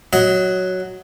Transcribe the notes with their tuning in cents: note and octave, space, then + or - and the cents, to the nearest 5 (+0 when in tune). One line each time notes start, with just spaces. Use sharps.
F#3 +0 D#5 +20